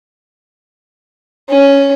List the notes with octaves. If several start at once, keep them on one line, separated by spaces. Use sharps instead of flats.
C#4